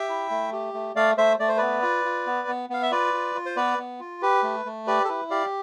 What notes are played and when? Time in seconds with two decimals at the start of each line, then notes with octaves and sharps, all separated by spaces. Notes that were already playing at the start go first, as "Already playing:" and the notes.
Already playing: G4 E5 G5
0.09 E4
0.31 A3
0.53 G4
0.74 A3
0.96 A3 D5 F5
1.17 A3 C5 E5
1.39 A3 D5
1.48 C5
1.57 B3 B4 D5
1.83 F4
2.05 F4
2.26 B3
2.48 B3
2.70 B3 F5
2.83 E5
2.91 F4 B4 D5
3.13 F4
3.35 F4
3.46 C5
3.56 B3 B4 D5
3.78 B3
4.00 F4
4.22 G4 B4
4.43 A3
4.65 A3
4.87 G4 B4 D5
5.05 A4
5.08 E4 B4
5.30 G4 D5 F5